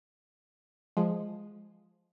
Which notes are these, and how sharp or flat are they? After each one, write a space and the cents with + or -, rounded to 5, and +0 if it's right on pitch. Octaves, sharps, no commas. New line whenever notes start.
F3 +0 G#3 +0